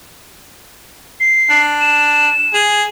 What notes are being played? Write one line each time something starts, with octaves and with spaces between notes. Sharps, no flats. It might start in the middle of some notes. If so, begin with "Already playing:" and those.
C7
D4
E7
G#4